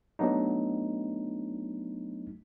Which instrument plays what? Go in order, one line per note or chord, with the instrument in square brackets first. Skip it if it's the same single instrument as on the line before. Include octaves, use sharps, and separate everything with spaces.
[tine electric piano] F#3 A3 B3 D4 D#4